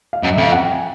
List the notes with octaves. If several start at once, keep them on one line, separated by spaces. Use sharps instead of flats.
F5
F#2 D#5
E5
F2 F5
F#5
G5
G#5